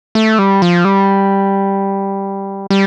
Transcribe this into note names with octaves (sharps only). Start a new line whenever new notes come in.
A3
G3
F3
G3
G3